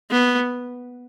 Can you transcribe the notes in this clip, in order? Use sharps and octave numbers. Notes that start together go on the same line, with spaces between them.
B3